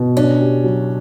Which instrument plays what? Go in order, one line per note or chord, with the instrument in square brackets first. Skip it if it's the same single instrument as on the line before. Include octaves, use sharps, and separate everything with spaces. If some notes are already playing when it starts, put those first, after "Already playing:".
Already playing: [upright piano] B2
[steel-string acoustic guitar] C#4 [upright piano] D4
[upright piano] G4
F#3